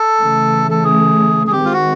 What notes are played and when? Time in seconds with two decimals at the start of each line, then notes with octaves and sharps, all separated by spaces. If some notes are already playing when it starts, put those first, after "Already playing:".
Already playing: A4
0.18 C#3 E3 A3
0.71 A4
0.84 G#4
1.47 G#4
1.52 D#3 G#3 C4 G4
1.65 F4
1.73 F#4